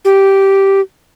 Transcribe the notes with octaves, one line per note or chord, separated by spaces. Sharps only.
G4